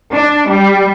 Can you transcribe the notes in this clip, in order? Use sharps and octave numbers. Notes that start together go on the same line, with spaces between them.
D4
G3